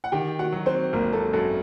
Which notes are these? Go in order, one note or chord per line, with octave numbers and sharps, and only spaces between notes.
F#5
D#3 G4 G5
F#4 F#5
F#3
C4 C5
G#1 A#3 A#4
A4
F#2 A4